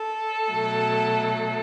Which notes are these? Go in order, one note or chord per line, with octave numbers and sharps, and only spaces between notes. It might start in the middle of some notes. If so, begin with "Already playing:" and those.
Already playing: A4
B2 F#3 A3